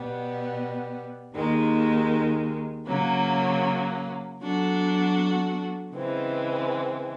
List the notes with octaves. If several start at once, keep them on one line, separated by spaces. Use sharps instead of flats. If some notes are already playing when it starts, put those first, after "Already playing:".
Already playing: B2 G3 B3
D#2 D#3 G#3
C#3 F#3 A#3 C#4
F#3 B3 D4 F#4 A4
C#3 E3 G#3 C4